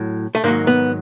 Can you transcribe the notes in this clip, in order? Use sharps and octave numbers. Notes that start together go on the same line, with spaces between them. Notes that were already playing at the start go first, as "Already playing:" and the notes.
Already playing: A2 F#3
A3
G#2 D#3 F#3 A#3
B3